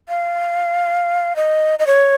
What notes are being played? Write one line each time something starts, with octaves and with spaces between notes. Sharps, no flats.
F5
D#5
D#5
C#5